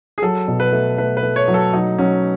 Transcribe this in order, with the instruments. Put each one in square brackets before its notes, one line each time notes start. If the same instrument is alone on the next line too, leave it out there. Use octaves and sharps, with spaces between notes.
[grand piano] G#4
[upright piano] F#3 [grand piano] A4
[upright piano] B2
[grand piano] B4
[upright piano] A3
[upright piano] A3 [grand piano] B4
[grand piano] B4
[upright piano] A3
[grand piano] C#5
[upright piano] F#3
[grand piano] A4
[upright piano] F#3 [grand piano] D#4
[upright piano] F#3 [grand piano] C#4